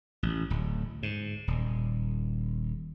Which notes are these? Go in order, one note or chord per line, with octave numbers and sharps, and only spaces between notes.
A1
D1
G#2
D#1